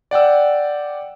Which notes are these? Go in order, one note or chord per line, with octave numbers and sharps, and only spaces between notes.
D5 F#5 G5 E6